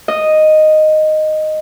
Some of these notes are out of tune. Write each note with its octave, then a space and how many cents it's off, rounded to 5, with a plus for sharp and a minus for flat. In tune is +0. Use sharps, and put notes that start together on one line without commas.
D#5 -5